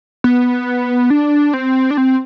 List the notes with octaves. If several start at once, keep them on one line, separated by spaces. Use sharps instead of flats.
B3
D4
C4
D4
C4